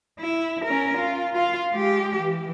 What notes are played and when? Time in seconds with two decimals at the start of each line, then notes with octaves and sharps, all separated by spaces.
0.20 E4
0.65 C#4 A#4
0.97 F4
1.34 F4 F5
1.72 G#3 G4
2.20 E3